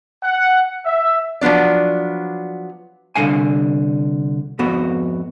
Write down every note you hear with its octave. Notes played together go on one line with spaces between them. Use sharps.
F#5
E5
F3 F#3 B3 D4 D5
C2 D3 G#3 F5 G#5
F2 G#2 B3 F#4